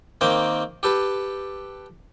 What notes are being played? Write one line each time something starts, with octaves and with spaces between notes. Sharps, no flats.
D#3 A#3 C4 G5 D6
G4 A4 B4